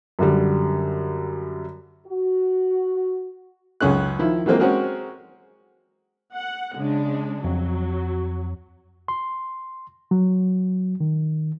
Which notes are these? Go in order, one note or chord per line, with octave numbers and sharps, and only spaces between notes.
F#2 D3 G3
F#4
C#2 F#2 C#4 G#4 F#6
D#3 F3 E4
E3 F#3 G#3 A#3 C4 F4
G#3 C4 C#4 F#4 G#4 A#4
F#5
C#3 G#3 D4
F2 F#3
C6
F#3
D#3